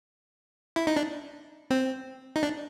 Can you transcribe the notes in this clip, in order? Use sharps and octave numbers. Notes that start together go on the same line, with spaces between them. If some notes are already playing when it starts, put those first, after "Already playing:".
E4
D#4
D4
C4
D#4
D4